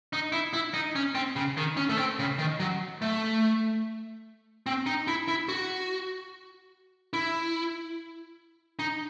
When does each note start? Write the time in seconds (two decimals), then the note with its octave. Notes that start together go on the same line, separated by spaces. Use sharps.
0.13 D#4
0.32 E4
0.53 E4
0.74 D#4
0.95 C#4
1.15 C4
1.36 C#3
1.57 D#3
1.77 C#4
1.89 A3
1.97 C4
2.19 C#3
2.39 D#3
2.60 F#3
3.02 A3
4.66 C4
4.86 D#4
5.07 E4
5.28 E4
5.49 F#4
7.13 E4
8.79 D#4